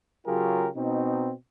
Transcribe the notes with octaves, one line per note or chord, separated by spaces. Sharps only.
C#3 F#3 F4 G4 G#4 A#4
B2 C4 D#4